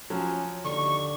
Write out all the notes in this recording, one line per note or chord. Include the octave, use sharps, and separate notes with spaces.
F3 F#3 C#4
D#2 D3 C#6